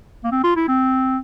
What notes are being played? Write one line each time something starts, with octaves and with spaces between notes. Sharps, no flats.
A#3
C4
F4
E4
C4